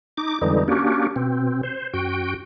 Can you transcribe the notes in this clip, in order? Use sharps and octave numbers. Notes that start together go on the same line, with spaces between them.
D#4 D6
F2 D3 E3 G3 G#3 D#4
A#3 C#4 D4 F#4 G4
B2 C4
C5
F#2 F#4 G5